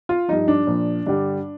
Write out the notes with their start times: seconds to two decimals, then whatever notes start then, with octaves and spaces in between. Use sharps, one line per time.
0.09 F4
0.28 G2 F3 D#4
0.48 D4
0.67 A#2 F3
1.07 G2 D3 G3 D4